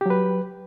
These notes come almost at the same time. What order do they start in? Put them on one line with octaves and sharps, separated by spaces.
G4 F#3 B4